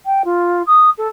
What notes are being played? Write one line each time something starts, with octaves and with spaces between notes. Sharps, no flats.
G5
F4
D#6
A4